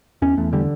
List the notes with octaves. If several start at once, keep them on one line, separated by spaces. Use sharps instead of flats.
E2 C#4
E2 A3
D3 G3